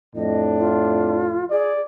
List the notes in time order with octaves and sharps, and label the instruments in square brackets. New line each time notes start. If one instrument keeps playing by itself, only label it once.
[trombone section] F2 A2 [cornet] D4 [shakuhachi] D#5
[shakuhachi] F4
[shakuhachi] G#4 [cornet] D5